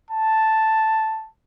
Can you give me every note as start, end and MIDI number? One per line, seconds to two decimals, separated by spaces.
0.11 1.28 81